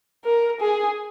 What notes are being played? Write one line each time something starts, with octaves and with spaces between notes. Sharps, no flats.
A#4
G#4